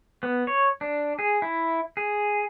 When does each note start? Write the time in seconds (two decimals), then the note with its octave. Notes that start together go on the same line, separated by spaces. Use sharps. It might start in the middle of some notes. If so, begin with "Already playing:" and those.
0.23 B3
0.47 C#5
0.81 D4
1.19 G#4
1.42 E4
1.97 G#4